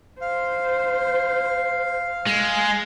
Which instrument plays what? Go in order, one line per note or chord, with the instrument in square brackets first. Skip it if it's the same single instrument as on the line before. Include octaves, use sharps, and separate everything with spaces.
[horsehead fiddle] C5 [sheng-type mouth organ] F5
[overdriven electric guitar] G#3